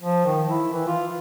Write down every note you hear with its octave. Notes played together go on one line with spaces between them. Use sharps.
F3
D#3
E4
E3
F4